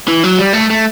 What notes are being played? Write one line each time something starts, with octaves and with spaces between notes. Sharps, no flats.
E3
F#3
G3
A3
A3